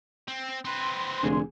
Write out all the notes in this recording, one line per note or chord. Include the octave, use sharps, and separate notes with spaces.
C4
C4 B4 C6
F1 D3 D4 G#4